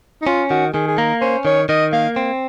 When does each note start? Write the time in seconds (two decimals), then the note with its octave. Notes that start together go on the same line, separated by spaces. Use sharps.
0.22 D#4
0.27 C#4 F4
0.50 D#3 F#4
0.74 D#3 G#4
0.87 G#4
0.98 A#3 A#4
1.21 C#4 C5
1.45 D#3 C#5
1.69 D#3 D#5
1.93 A#3 F5
2.16 C4